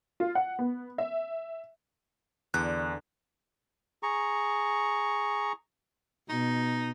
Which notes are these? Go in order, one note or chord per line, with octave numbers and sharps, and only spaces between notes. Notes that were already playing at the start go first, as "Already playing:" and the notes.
F4
F#5
B3
E5
E2 D3 F#6
G#4 A#5 C#6
B2 D#4